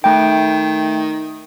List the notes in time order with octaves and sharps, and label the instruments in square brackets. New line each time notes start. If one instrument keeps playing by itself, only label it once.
[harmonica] D#3 [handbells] A3 G5